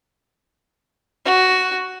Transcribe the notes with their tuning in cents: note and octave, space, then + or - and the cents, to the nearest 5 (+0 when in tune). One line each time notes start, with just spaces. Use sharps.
F#4 +5